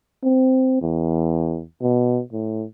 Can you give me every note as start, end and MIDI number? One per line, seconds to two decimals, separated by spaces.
0.23 0.77 60
0.82 1.63 40
1.82 2.22 47
2.33 2.65 45